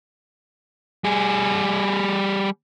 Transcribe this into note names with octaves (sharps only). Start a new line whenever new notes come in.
G3 G#4